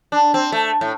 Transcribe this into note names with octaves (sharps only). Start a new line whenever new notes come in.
D4
C4
A3
A2